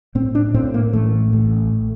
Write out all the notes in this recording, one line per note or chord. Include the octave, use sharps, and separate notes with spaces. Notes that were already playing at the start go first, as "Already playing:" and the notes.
A2 C4
D4
A2 C4
A#3
A1 A3
A1